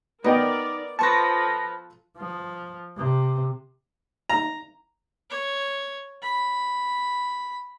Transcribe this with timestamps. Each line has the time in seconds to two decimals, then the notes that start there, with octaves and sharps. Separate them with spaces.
0.24 B3 D#4 A#4 D5 D#5 G5
0.99 F3 A4 B4 C5 A5 C#6 A#6
2.17 F3
2.97 C3
4.29 A#5
5.30 C#5
6.23 B5